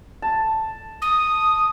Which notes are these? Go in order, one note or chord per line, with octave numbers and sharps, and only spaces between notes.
A5
D#6